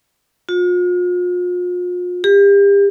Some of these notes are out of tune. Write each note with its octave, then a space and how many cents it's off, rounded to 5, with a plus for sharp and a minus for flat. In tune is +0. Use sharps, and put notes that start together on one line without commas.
F4 +40
G4 +35